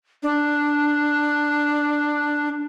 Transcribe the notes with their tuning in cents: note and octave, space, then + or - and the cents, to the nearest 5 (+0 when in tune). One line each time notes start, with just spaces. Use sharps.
D4 +5